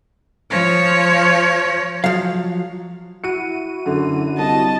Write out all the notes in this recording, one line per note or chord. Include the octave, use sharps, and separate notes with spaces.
F3 C#5
F3 F#3 F5
E4 F#4 C#7 D#7
F#2 D3
C2 D#5 A5